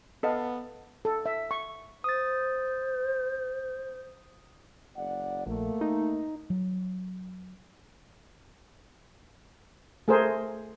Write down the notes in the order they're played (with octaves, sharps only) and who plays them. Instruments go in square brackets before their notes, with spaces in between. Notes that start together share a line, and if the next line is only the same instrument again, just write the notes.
[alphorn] B3 [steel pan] A4 D#5 F5
[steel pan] A4
E5
C#6
[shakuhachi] C5 [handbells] D#6 A6
[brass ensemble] F#1 D5 F#5
[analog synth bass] A#1 [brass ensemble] A3 A#3
[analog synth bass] D#4
[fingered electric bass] F#3
[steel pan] A3 G#4 A#4 C5